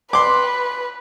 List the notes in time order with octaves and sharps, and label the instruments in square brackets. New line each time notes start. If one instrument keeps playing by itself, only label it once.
[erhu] B4 [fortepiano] C6 D6